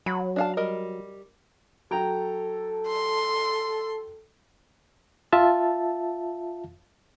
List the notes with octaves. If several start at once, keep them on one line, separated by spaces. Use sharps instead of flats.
F#3 B5
D4 F5 A5
G3 A#4 D#5
F#3 A4 G5 A#5
C6
F4 E5 A5